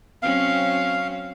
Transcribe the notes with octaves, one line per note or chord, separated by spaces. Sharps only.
F#3 C4 C#4 F5